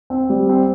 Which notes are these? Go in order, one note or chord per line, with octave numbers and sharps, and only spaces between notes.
C4
G3
C4